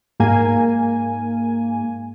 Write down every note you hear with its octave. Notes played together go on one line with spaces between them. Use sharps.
G#2 A#3 G#5